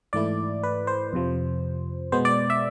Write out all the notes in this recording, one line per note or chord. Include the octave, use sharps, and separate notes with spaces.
G#2 E3 A3 E4 D5
B4
C5
F2 C3 F3
B2 G#3 B3 C5
D5
E5